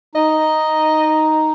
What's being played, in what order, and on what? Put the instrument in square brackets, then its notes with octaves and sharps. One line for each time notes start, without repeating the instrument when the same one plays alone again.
[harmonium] D#4 [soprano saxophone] D#5